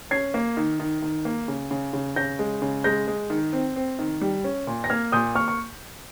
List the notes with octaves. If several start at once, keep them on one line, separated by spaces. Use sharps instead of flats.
C#4 G#6 C7
A#3
D#3
D#3
D#3
A#3
C#3
C#3
C#3
C#3 G6 A#6
G#3
C#3
G#3 G6 A#6
G#3
D#3
C4
C4
D#3
G3
C#4
A#2
A#6
A#3 F6 G#6
A#2 D#6 G6
A#3 C#6 F6
C#6